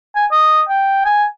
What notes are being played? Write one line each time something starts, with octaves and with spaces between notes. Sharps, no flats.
G#5
D#5
G5
G#5